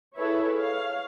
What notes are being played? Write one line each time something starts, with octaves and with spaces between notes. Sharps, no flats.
E4 G#4 A4 B4 C#5 E5
C#5 F5